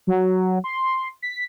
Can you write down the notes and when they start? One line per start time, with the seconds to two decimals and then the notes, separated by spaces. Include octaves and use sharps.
0.07 F#3
0.64 C6
1.22 B6